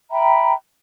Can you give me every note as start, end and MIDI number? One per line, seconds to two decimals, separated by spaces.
0.11 0.53 76
0.11 0.53 79
0.11 0.53 82
0.11 0.53 83